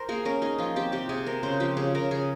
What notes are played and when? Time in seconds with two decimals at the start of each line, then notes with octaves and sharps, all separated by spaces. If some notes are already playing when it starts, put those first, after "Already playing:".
Already playing: A#4 C5
0.09 A#3 G#4
0.25 C#4 A#4
0.41 D#4 G#4
0.58 F3 F4
0.76 C4 G4
0.92 C3 G4
1.09 C3 G#4
1.26 C4 A#4
1.43 C#3 C5
1.60 F3 G4
1.77 C#3 G#4
1.95 C#3 A#4
2.11 C#3 G#4